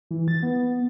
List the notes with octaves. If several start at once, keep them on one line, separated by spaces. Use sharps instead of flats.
E3
A6
B3